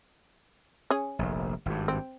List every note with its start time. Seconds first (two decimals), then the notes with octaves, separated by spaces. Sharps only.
0.90 C#4 G#4
1.19 F1 A#1
1.66 G#1 G2
1.88 C4